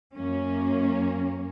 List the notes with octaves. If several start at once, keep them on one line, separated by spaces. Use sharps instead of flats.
F#2 A#3 C#4